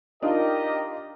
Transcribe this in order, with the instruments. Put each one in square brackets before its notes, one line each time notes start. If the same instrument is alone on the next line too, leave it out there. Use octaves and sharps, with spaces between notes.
[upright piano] D4 D#4 F4 [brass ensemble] G4 A#4 D#5